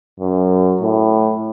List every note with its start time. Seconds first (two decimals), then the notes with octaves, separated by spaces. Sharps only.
0.20 F#2
0.81 A2